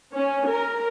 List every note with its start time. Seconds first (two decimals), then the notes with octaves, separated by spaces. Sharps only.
0.15 C#4
0.48 A#4